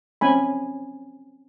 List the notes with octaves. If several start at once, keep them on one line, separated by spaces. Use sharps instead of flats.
C4 C#4 G#5 B5